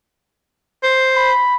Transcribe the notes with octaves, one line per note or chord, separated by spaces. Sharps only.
C5
B5